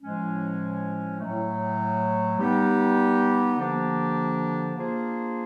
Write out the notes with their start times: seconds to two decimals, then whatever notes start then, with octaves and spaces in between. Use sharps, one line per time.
0.02 A2 F3 G#3 C#4
1.20 A2 F#3 A3
2.39 G3 B3 D#4 G4
3.57 D3 F3 A#3 D4 G4
4.76 A#3 D4 F4 G#4 C5